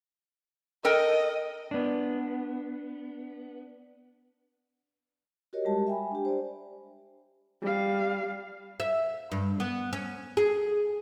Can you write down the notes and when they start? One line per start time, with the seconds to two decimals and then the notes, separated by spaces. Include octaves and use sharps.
0.85 A4 A#4 D#5 G5
1.71 B3 D4
5.53 F#4 G4 A#4 C#5 D#5
5.65 G3 G#3 G4 A5
5.87 E5 G5 G#5 B5
6.11 D4 G4
6.25 C5 D5
7.61 G3 F5
8.80 E5
9.32 G2
9.60 B3
9.93 C#4
10.37 G#4